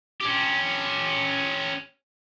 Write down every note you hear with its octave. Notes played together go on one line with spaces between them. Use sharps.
C#4 G4